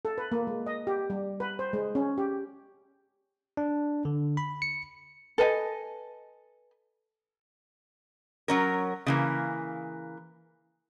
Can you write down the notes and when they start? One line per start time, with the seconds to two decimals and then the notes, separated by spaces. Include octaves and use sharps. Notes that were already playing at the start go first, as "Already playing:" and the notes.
0.05 A4
0.18 B4
0.32 A#3
0.47 G#3
0.66 D#5
0.87 G4
1.10 G3
1.40 B4
1.59 C5
1.73 G#3
1.95 C#4
2.18 G4
3.57 D4
4.05 D3
4.37 B5
4.62 C#7
5.38 A4 B4 D#5 G#5
8.48 F#3 C#4 A#4
9.06 C#3 E3 A#3